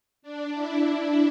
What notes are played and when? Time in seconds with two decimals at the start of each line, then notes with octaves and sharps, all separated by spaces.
0.22 D4
0.53 E4